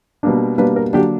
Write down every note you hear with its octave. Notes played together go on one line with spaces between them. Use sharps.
B2 G3 A#3 D4
B2 G3 A#3 D4 B4
A#4
D3 F#3 A#3 D4 G4